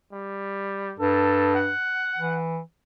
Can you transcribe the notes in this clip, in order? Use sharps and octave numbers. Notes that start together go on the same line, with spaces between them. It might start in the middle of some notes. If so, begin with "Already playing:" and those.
G3
G2 A4
F#5
E3